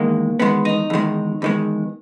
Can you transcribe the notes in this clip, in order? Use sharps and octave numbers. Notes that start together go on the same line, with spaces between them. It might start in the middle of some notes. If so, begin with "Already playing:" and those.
Already playing: E2 D#3 G#3 A#3
E2 D#3 G#3 B3
D#4
E2 D#3 G#3
E2 D#3 G#3